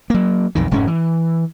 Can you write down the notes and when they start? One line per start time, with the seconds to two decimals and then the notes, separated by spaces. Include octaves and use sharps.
0.10 F#3 A#3
0.55 B1 F2 D#3
0.71 F1 G#2 G#3 C#4
0.87 E3